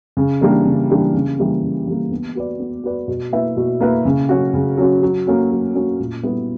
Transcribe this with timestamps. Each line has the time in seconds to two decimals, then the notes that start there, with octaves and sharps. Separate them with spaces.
0.17 C#3
0.41 E3 G3 A#3 D4
0.65 C#3
0.90 E3 G3 A#3 D4
1.14 C#3
1.39 E3 G3 A#3
1.63 C#3
1.87 E3 G3 A#3
2.12 B3
2.35 F#4 B4 D5
2.59 B3
2.84 F#4 B4 D5
3.08 B2
3.32 A#3 E4 B4 E5
3.57 B2
3.80 A#3 E4 B4 E5
4.05 C#3
4.29 F#3 C#4 F#4
4.54 C#3
4.78 F#3 C#4 F#4
5.03 F#3
5.27 A#3 C#4 F#4
5.51 F#3
5.75 A#3 C#4 F#4
6.00 A#2
6.23 G3 B3 E4 B4